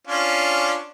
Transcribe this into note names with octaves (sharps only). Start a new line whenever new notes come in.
C#4 D4 F4